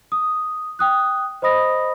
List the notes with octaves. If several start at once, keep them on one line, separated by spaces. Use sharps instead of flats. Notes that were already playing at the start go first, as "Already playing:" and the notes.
D#6
G5 D#6 F#6
C5 D#5 B5 D#6 A#6